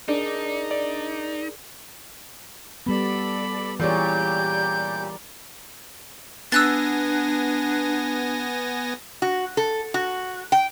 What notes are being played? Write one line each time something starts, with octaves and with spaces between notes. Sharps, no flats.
D4 D#4 G#4 A#4
D5
G3 B3 A4 D5 B5
A#2 E3 G3 G4 G#4 C#5 D5 G6
B3 D4 G#5 E6 F#6 A6 A#6
F#4
A4
F#4
G5